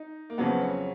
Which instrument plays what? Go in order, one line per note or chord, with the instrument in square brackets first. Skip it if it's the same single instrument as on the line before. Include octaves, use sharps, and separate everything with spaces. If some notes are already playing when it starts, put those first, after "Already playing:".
Already playing: [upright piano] D#4
A#3
F2 C#3 F#3 B3
C#4